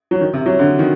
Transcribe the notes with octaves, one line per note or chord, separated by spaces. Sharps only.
F#3
D#3
C3
F#3
D3
D#3